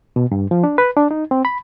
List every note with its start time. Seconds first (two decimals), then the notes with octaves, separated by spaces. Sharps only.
0.16 B2
0.32 G2
0.51 F3
0.64 D4
0.78 B4
0.97 D4
1.11 D#4
1.31 C4
1.45 B5